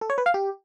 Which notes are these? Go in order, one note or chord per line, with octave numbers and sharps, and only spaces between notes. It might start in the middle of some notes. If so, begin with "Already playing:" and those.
A4
C#5
B4
F5
G4